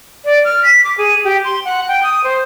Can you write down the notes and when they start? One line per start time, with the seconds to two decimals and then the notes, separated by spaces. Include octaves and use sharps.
0.25 D5
0.44 F6
0.63 B6
0.84 D6
0.98 G#4
1.24 G4
1.44 C6
1.65 F#5
1.88 G5
2.03 D#6
2.24 C5